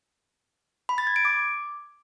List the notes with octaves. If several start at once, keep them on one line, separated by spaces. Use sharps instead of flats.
B5
A6
G#6
D7
D6